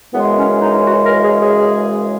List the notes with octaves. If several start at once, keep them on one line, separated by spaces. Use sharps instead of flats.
F#2 C#3 E3 G#3 B3
C#4
D#4
F#4
A#4
G#4
G#4